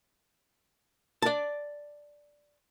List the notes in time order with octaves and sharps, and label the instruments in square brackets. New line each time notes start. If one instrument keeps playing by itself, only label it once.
[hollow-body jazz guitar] D5 A5